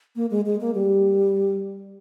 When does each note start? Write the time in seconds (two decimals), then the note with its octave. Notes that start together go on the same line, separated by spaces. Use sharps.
0.16 A#3
0.31 G#3
0.46 G#3
0.61 A#3
0.75 G3